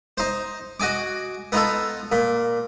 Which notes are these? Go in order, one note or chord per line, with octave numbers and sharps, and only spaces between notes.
D#4 C5
F#4 D#5 G#5 D6
B3 D#4 F4 A4
A#2